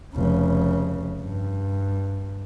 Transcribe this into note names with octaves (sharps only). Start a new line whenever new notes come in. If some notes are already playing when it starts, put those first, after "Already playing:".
F1 C#3
G2